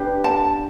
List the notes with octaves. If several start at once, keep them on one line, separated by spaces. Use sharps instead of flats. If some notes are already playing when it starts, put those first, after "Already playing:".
Already playing: D4 G4 B4
A5